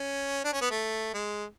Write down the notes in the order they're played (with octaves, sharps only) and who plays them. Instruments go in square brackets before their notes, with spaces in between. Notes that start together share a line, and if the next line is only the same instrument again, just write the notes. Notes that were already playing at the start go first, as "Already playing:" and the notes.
Already playing: [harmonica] C#4
D4
C#4
B3
A3
G#3